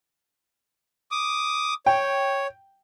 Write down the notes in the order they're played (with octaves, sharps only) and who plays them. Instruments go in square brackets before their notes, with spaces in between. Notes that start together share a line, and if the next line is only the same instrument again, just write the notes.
[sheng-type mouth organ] D6 D#6
[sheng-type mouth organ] C#5 [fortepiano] G5